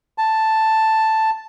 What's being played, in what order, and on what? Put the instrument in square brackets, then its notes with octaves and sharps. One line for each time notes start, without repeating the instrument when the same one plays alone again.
[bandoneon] A5